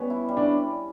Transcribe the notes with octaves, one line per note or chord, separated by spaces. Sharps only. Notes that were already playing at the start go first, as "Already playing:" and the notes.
Already playing: G3 B3 C#4
E4
G3
D4